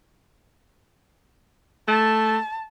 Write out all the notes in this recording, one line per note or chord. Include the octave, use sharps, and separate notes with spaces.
A3 A5